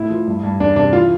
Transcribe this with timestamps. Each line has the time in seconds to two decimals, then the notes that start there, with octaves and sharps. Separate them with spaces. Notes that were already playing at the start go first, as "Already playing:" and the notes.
Already playing: A2 E4
0.10 F3
0.27 G2
0.43 G2
0.60 E2 D4
0.76 C3 D4
0.93 E3 F4